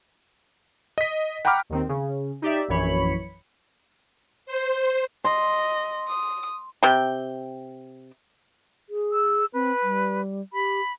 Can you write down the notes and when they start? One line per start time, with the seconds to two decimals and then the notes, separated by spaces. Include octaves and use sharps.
0.98 D#5 B6
1.45 F#5 G5 A#5 B5 D6 F6
1.70 D#2 D#3 C4
1.89 C#3
2.42 D#4 G4 D5 E5
2.68 A#1 F#2 E3 C#5 B5 C#7
4.46 C5
5.25 D#5 C6
6.08 D#6
6.83 C3 G5
8.89 G#4
9.12 E6
9.54 C4 B4
9.82 G3
10.53 G4 B5